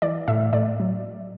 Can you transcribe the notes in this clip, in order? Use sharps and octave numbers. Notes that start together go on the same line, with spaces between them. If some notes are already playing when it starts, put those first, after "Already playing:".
E3 D5
A2 E5
A2 D5
F#3